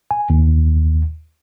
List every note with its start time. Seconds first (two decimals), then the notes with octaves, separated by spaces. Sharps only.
0.11 G#5
0.30 D#2